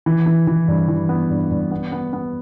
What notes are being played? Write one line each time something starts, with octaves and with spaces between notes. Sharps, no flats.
E3
E3
E3
G2
E3
B3
G2
G2
B3
B3
B3